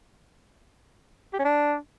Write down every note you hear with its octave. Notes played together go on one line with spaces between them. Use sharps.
G4
C#4
D4